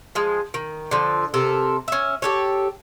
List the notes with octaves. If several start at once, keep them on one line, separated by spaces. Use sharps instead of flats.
F3 G#3
D#3
D3 F3
C3 A4 A#4
C#4 E5
G4 A4 C#5